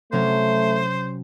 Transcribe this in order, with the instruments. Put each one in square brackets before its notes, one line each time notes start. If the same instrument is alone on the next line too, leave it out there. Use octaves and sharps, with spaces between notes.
[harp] C3 F#3 C#4 [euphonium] A3 [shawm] C5